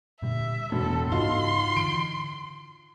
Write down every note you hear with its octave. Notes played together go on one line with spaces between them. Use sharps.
A#2 D3 G3 E5
E1 A2 E3 B3 A4
G#2 C#3 B3 D#4 F4 F#4 C6
D3 E3 D7